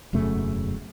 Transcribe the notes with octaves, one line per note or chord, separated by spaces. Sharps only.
E1 F#2 C#3 A3